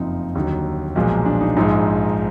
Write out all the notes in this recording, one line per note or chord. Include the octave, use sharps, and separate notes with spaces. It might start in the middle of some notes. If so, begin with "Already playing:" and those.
Already playing: F#1 F2 F3 D#4
D#2 D3 F#3 D#4
B1 A#2 F3 G#3
D4
D#4
A#1 G#2 F3 G#3 D#4